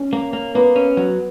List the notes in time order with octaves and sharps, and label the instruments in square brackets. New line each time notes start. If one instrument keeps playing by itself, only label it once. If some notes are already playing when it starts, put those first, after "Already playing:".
Already playing: [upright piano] C#4
[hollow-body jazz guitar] A#3
A#3
[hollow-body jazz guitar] A#3 [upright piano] B3
[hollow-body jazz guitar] C#4
F#3